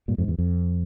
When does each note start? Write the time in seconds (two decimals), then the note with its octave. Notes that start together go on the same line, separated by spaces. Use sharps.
0.08 G2 A#2
0.18 F2 G#2
0.28 E2
0.38 F2